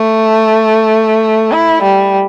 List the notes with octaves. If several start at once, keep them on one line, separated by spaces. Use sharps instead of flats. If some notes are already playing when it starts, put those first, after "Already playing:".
Already playing: A3
E4
G3